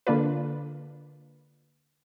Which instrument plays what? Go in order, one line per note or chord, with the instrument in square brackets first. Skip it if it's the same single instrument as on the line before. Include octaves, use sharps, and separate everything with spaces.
[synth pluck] D3 A#3 D4 F4 B4